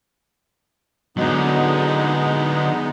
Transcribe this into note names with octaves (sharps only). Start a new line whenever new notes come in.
D3 F#3 G#3 B3 D#4